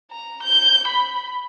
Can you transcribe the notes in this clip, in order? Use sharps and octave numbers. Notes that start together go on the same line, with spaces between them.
A#5
G6
B5